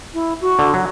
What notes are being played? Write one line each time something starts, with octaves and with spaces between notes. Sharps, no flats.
E4
F#4
D3
F#3